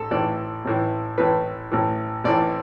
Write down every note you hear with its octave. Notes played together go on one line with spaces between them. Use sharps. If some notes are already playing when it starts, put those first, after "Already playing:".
Already playing: A1 A4
A1 A2 E3 D5
A1 A2 E3
A1 A2 E3 B4
A1 A2 E3
A1 A2 E3 D5